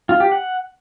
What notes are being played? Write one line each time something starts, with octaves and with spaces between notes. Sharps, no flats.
F4
G4
F#5